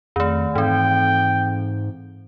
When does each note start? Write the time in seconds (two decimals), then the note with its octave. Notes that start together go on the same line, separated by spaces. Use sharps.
0.16 F2 D#3 A3
0.55 G#2 E3 C4 G5